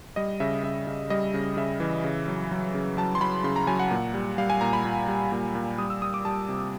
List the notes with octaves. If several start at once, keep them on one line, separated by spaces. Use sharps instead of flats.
G3 D#5
C#3 E5
C#3 E5
C#3
G3 D#5
C#3
C#3 E5
E3
C#3
F#3
F#3
C#3
F#3 A5
C6
F#3 B5
C#3 C6
A#5
F#3 G#5
F#5
A#2
G3
G3 F5
G#5
A#2 A#5
B5
A#2
G3
A#2
A#2
G3 D#6
E6
G3 D#6
D6
G3 A5
C3